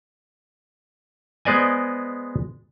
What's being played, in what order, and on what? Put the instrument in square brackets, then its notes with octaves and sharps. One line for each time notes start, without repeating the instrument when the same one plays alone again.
[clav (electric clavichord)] G#3 B3 C5 D5 D#5 G#5